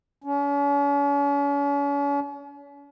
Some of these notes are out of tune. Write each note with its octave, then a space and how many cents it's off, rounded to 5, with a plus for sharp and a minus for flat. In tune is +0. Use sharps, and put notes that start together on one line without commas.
C#4 +40